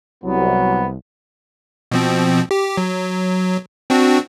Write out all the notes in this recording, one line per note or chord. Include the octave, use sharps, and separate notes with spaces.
C2 F#3 B3
B2 F3 C4
G4
F#3
C4 D4 F#4